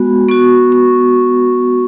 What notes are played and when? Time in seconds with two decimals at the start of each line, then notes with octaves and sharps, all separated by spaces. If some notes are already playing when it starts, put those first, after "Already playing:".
Already playing: G#3 B3 F#4 B5
0.29 B3 F#4 C#6
0.72 C#6